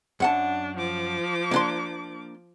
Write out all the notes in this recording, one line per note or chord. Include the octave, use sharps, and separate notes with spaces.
F#2 D4 F#5 A5
F3 D6
A#3 D4 C6